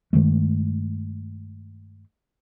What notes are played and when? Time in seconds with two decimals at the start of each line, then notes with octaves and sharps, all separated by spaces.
0.13 G2 D#3 G#3 A3